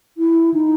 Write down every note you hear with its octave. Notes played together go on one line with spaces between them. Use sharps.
E4
D#4